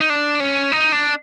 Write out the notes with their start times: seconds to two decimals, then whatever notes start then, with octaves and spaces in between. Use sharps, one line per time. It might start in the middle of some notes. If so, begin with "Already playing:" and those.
0.01 D#4
0.10 D4
0.40 C#4
0.72 D#4
0.92 D4